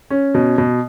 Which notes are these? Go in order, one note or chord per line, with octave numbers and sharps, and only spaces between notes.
C#4
B2
B2